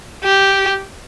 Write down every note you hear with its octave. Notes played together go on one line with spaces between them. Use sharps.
G4